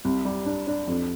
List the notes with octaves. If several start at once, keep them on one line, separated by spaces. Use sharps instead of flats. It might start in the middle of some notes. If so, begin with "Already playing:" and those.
C2
G3
D4
D4
F2